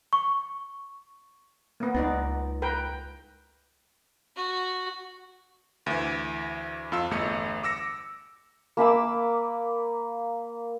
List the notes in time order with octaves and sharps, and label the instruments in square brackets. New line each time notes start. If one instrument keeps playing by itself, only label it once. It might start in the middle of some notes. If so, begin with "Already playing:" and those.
[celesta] C#6
[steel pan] A#3 B3
[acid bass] C#2 [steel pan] B3 D#4 D5
[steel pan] A#4 B4 G5
[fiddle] F#4
[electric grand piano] D2 E3
F2 F4 E6
G1 E2 A3 D#5 C#7
D6 E6 A#6 C#7
[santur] A#3 B5 D6 E6